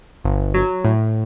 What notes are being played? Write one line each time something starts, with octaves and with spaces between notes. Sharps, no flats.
G1
F#3
A2